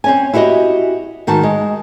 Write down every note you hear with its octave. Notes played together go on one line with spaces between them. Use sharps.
C4 C#4 G#5
E4 F#4 G4 C5 D#5
G#2 D#3 F#4 A5
G#3